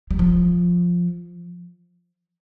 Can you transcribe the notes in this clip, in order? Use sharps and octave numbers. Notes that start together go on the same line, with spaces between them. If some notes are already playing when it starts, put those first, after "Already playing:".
G3
F3